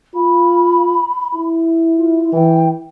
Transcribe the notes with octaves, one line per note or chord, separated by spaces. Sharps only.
F4 B5
E4
F4
E3 G5